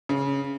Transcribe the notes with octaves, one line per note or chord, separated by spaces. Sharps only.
C#3